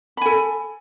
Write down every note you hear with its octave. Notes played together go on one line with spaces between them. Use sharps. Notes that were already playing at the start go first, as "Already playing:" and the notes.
A4 G#5 B5